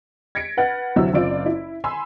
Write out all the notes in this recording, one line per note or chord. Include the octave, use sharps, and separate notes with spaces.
G#6 A#6 B6 C#7 D7
B4 F#5 F6 A6
D2 C3 F#3 E4 E6
F#1 C4 F4 D5 D7
E4
G#5 B5 C6 E6